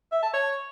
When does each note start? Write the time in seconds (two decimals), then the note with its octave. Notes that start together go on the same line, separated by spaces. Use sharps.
0.12 E5
0.23 A5
0.34 C#5